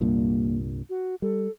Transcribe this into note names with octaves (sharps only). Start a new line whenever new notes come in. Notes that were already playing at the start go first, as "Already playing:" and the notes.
C2 G2 A#2 A#3
F#4
G3 A4